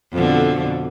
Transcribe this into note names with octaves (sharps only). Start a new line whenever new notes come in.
F2 B2 D3